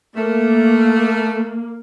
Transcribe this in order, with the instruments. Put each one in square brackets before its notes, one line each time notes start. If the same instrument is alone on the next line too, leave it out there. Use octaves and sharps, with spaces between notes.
[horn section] A3 [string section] A#3